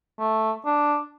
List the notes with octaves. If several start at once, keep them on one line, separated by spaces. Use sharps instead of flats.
A3
D4